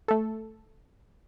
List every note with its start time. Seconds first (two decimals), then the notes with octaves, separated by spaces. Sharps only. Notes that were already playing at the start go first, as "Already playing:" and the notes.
0.08 A3 A4